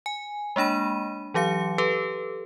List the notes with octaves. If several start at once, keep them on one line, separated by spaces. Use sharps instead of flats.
G#5
G#3 A#3 D4 B5 D#7
E3 F#3 G4 F5 C#7
G4 A4 B4